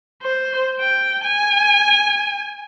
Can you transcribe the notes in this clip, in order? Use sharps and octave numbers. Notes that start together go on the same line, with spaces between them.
C5
G5
G#5